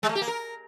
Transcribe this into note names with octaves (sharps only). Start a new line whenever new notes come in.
G#3
A3
G4
A#3
A#4